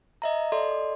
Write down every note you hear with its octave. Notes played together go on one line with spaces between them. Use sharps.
D#5 E5 A#5
A4 D5 D#5 C6